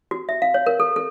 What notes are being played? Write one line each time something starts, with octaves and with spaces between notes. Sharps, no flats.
F#4
E5
F5
C#5
A#4
A4
A4